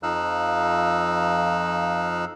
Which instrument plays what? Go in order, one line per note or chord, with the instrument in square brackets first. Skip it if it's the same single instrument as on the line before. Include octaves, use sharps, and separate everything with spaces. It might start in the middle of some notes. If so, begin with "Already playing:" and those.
[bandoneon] F2 F3 D#4 F5 E6 F#6